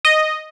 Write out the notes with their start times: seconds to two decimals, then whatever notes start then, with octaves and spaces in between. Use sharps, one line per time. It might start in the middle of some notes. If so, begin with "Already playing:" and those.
0.05 D#5